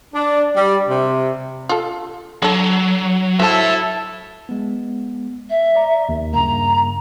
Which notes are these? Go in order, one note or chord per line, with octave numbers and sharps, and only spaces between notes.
D4
G3
C3
F4 A4
D3 F#3 A4
E4 F#4 A4 C5 C#5 E5 A5
G#3 B3
E5
D5 A#5
D#2 D#3
G2 C#3 A#3 A#5